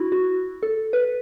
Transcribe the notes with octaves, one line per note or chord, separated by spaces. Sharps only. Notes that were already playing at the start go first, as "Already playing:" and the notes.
Already playing: E4 F#4
F#4
A4
B4